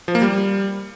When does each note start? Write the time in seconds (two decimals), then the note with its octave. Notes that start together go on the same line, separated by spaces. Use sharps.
0.08 F3
0.15 A#3
0.22 G3